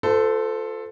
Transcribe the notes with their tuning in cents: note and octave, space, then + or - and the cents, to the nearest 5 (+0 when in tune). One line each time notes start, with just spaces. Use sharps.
F4 +10 A4 +0 C5 -40